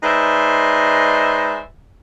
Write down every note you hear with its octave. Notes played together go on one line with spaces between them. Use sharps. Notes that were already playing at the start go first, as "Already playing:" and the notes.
G#3 D#4 B4 C5 D5 E5